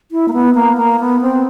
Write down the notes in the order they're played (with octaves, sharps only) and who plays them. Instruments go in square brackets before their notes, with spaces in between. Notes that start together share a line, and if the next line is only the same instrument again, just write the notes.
[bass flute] E4
A#3
B3
A#3
A#3
B3
C4